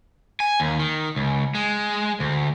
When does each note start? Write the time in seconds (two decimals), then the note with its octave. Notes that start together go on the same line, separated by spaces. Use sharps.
0.40 G#5
0.60 D#2
0.79 D#3
1.16 C#2
1.55 G#3
2.20 D2